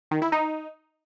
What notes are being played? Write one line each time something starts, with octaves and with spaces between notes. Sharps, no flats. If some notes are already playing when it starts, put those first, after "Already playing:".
D#3
E4
D#4